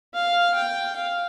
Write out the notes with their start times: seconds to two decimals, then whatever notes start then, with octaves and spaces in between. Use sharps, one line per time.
0.14 F5
0.55 G5
0.96 F5